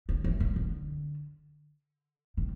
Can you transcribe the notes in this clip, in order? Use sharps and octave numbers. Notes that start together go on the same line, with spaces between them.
D3
E3
D#3
D3
D#3